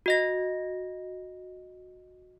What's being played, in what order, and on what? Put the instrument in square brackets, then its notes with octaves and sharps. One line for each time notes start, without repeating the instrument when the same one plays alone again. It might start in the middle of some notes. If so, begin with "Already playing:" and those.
[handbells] F#4 D#5 A#6